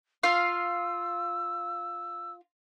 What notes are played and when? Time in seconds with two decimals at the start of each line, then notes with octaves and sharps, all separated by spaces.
0.23 F4 F5 E6